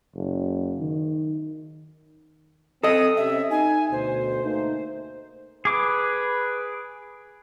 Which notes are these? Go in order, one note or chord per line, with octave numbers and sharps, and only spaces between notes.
F#1
D#3
C4 A4 D#5 D#6
C3 C#4 E5
D#4 G#5
D2 B2 C5
A3 A#3 D#4
G#4 B4 D6